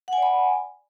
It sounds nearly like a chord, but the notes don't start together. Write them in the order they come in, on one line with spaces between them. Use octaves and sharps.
F#5 G#5 D5 B5